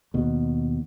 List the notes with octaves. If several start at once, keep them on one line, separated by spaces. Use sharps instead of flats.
D#2 B2